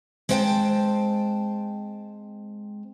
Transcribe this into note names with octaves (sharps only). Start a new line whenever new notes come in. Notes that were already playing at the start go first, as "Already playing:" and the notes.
G#3 C4 C5 F#5 G5 A5